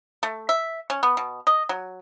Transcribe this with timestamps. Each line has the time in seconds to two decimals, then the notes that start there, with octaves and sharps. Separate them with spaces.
0.23 A3
0.49 E5
0.90 C#4
1.03 B3
1.17 B2
1.47 D#5
1.69 F#3